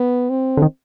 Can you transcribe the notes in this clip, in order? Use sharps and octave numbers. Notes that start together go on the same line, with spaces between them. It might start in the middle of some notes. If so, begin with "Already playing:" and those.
Already playing: B3
C4
D3
D#3